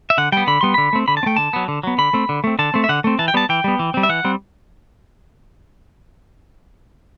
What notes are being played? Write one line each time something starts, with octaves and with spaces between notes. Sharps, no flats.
E5
D3 F#5
G3 B3 G5
D3 B5
G3 B3 C6
D3 B5
A3 C4
D3 B5
A5
C4
A3 G5
D3 A5
F#3 B3
D3
F#3 B3
D3 B5
A3 C4
D3
A3 C4
D3 A5
A3 C4
E5
D3 F#5
A3 C4
E3 A5
G5
G3 B3 A5
E3 G5
G3 B3
E3
G3 C4
E5
E3 F#5
G3 C4